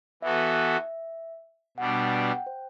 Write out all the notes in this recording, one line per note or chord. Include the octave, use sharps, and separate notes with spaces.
E3 B3 F#4 A4 E5
B2 G3 D4 F#5
F#5
G5
C5